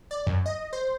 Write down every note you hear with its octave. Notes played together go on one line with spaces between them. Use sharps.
D5
F#2
D#5
C5